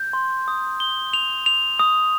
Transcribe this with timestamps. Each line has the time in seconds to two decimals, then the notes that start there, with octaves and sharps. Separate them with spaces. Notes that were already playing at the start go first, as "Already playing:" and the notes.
Already playing: G6
0.13 C6
0.48 D#6
0.80 G7
1.13 F7
1.46 F7
1.79 D#6